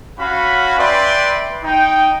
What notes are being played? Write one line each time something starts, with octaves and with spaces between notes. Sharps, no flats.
C#4 F#4 F5 B5
B4 D5 E5 G5 C6
D#4 G5